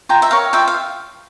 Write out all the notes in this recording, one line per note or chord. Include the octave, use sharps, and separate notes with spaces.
F4 G5 A#5
E5
A#4 C#5 F5
F4 E5 G5
F5